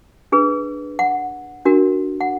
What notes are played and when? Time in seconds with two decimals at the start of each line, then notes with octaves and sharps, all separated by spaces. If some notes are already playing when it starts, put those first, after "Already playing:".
0.32 D4 G#4 B4
0.99 F#5
1.65 D4 F#4 A#4
2.21 F#5